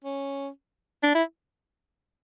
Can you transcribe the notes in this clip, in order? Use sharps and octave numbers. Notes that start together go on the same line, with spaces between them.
C#4
D4
E4